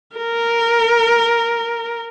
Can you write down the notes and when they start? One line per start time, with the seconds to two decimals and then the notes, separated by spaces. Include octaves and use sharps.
0.17 A#4